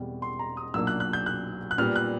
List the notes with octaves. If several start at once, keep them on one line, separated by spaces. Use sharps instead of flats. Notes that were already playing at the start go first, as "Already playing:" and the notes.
Already playing: E1 E2 B2 G3 C4
C6
A#5
D#6
B1 A#2 F#3 A#3 D4 E6
F#6
F#6
G6
F#6
F#6
A#2 G3 B3 F6
F#6